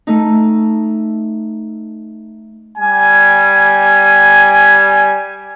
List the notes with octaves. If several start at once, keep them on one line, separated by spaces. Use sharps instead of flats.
A3 D#4
G3 G#5